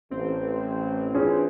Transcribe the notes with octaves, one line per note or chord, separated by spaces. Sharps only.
A1 C4
E3 C#4 D4 F4 G#4 C#5